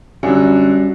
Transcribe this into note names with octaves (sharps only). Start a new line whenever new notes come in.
F#2 D3 G3 C#4 F#4